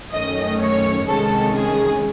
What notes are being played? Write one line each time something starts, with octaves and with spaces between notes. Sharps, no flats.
F#2 D#3 A3 C#4 D#5
C#5
C2 C3 D#3 G#3 C#4 A4
G#4